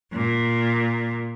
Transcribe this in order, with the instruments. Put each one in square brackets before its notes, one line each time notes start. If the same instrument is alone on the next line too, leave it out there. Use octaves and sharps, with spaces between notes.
[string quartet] A#2